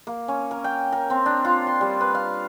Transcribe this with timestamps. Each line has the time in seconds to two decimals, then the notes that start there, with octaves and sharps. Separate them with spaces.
0.07 A#3
0.28 C#4
0.51 A#4
0.64 G5
0.92 A#4
1.10 C4
1.26 D4
1.45 F4
1.67 C6
1.81 G3
2.01 B4
2.15 F5